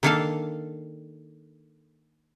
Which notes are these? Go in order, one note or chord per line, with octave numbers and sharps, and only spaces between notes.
D#3 A#3 D4 A4 F5 A5